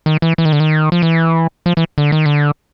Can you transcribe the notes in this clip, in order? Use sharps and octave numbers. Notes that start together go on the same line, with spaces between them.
D#3
E3
E3
D#3
D3
D#3
F3
E3
F3
E3
D3
D#3
D3